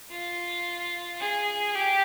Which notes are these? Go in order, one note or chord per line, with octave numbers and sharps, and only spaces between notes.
F4
G#4
G4